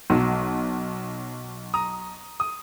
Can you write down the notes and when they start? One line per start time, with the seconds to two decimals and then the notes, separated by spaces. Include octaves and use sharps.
0.10 B1 F#3
1.74 A#5 D#6
2.40 D#6